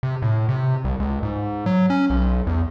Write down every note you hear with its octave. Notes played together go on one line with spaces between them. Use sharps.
C3
A2
C3
C2
C#2
G#2
F#3
C#4
B1
E2